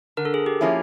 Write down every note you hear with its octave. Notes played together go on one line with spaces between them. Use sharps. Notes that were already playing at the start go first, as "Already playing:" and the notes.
D3 A#4
A4
G#4 A#4
G4
F3 A#3 C#4 E4